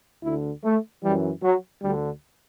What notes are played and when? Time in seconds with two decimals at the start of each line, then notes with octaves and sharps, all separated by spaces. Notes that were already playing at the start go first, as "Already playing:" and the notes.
0.23 D2 D3 E4
0.64 A3
1.02 F#2 E3 G3
1.43 F#3
1.82 D2 D3 G3